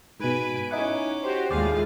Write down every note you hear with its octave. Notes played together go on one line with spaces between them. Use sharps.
G#2 B2 B4 G#5 B6 D7
C#4 D#4 E4 F#5 G#5 D6
F#4 G4 C5
D#2 A2 G#3 F4 G#4 C5 D5 F5